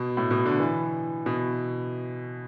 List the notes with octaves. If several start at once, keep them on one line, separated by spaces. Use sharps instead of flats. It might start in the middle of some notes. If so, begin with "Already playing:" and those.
Already playing: B2
A2
B2
D3
E3
B2